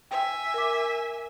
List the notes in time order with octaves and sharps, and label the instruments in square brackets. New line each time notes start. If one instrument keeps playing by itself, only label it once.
[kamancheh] E5 G#5 [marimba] G5
[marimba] A#4 D6